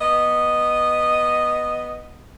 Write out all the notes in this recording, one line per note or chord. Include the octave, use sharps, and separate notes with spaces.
B3 D#5